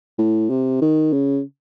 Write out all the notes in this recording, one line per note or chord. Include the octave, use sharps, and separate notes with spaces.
A2
C3
D#3
C#3